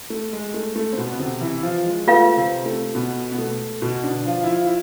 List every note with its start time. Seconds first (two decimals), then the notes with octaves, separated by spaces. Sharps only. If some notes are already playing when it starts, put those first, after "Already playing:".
0.10 A3
0.33 G#3
0.54 A3
0.76 A3
0.93 C4
0.98 B2 B3
1.13 B3
1.19 C3 C4
1.41 E3 E4
1.63 F3 F4
1.86 G#3
2.07 A3 F4 B4 F5
2.36 C3 C4
2.66 A3
2.94 B2 B3
3.32 B3
3.38 A3
3.82 B2 B3
4.04 D3 D4
4.26 F3 F4
4.43 E4
4.47 F3 F4
4.65 E4